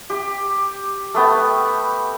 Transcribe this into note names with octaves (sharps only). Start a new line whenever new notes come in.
G4
A3 B3 G5